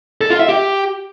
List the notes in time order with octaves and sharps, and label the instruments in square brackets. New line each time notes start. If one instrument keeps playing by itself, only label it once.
[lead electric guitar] A4
F4
E5
G4